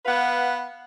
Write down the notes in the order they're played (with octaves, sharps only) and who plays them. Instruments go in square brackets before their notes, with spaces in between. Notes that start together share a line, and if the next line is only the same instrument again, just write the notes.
[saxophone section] B3 B4 F5 F#5